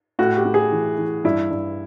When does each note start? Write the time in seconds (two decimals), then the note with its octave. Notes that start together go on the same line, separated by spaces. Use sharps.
0.19 A2 F#4
0.37 G4
0.45 A2
0.54 G#4
0.72 E3
0.98 E3
1.24 G2 E4
1.51 G2